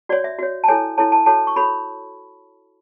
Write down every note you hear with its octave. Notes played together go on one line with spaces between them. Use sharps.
F#4 C#5 D5
E5
F#4 C#5
A5
E4 A4 C#5 G#5
E4 A4 C#5 A5
A5
F#4 A4 C#5 A5
C#6
F#4 A4 C#5 B5